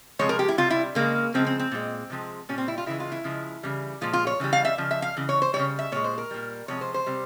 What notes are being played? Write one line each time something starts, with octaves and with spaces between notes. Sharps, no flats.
C3 F3 G#3 C#5
A#4
G4
E4
C3 G3 F4
E4
C#3 F3 G#3 A#3
C#3 F3 G#3 C4
C4
C4
A#2 F3 G#3
C3 F3 G#3
A#2 G3 C#4
C4
E4
F4
C#3 E3 G#3 E4
F4
E4
C#3 F3 G#3
C#3 E3 G3
A#2 F3 G#3 F4
F4
C#5
C#3 E3 G3
F5
E5
C#3 F3
E5
F5
C#3 E3
C#5
C5
E3 G3 C#5
C#3
E5
A#2 G#3 C#5
C5
A#4
A#2 G3
C3 F3 G#3 C#5
C5
C5
C3 G3